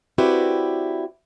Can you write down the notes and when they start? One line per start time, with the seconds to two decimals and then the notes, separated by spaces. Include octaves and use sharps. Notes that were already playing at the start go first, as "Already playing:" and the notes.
0.18 C4 E4 F#4 G4 B4 D5